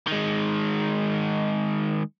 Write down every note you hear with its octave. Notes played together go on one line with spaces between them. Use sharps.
D#3 G#3